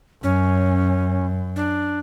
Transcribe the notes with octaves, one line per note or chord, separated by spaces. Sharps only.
F#2 C#4
D4